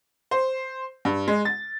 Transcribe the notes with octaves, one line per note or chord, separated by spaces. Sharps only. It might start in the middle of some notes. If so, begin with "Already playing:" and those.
C5
G2
G#3
A6